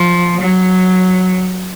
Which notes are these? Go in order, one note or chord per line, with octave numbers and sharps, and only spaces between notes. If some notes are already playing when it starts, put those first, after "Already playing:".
Already playing: F3
F#3